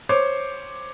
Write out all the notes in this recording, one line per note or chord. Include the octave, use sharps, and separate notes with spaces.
C5 C#5 D6